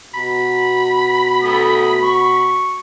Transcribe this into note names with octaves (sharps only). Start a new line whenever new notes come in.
B2 F#4 B5
A3 D#6
C#6